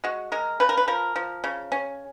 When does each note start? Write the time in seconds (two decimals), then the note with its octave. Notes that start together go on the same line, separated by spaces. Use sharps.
0.04 G#3 F#4
0.32 G#3 A#4
0.60 C#3 B4
0.69 A#4
0.77 B4
0.88 F3 A#4
1.16 F3
1.44 C#3
1.72 C#4